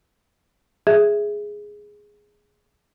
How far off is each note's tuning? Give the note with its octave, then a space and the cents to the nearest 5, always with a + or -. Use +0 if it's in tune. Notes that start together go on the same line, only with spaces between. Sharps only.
G#4 +0 E5 +0